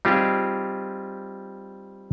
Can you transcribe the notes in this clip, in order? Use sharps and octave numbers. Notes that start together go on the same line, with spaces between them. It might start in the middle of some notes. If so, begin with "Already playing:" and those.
G3 C4 D#4 F4 G4 G#4